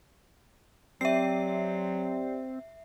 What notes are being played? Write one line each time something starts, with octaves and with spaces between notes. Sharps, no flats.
F#3 C4 G4 D5 E5 G5 C7